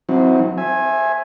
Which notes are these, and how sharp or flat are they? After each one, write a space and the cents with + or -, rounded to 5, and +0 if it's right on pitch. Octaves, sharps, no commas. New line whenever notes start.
F#3 -30 C4 +0 E4 -45
C5 +40 E5 +0 G#5 +0